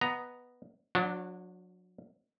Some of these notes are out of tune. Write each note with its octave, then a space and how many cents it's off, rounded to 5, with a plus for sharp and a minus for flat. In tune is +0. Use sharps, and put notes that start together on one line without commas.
B3 +0 D#5 +0 A#5 +0
F#3 -30 D4 +0 F#4 +0